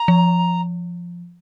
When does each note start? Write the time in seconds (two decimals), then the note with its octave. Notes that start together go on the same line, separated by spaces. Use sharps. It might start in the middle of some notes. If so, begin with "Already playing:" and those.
Already playing: A#5
0.08 F3